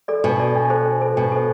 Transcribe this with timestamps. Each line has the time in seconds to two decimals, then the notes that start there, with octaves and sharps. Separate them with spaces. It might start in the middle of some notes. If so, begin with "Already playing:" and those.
0.08 A4 D5
0.24 B2 D4
0.40 A4 D5
0.55 D4
0.70 A4 C5
0.86 D4
1.02 A4 C5
1.17 B2 D4
1.32 A4 C5